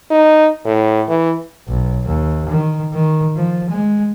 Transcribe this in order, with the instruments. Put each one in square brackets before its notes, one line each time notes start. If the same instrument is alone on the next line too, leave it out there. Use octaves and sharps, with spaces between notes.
[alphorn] D#4
A2
E3
[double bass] B1
D#2
D#3
D#3
F3
G#3